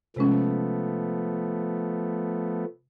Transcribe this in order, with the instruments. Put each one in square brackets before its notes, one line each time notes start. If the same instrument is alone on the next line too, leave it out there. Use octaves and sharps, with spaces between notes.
[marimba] C3 G#3 C#4 [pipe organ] F3 A3 B3